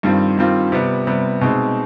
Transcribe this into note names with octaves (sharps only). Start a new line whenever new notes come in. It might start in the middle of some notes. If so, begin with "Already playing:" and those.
G2 D#3 G3 C4 F4
G2 D#3 G3 C4 F4
C3 G3 B3
C3 G3 B3
B2 G#3 C4 D#4